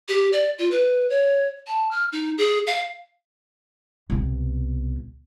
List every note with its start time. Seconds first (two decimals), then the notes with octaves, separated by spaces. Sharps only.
0.09 G4
0.33 D5
0.59 F4
0.71 B4
1.10 C#5
1.67 A5
1.91 F6
2.12 D#4
2.38 G#4
2.67 F5
4.10 C2 B2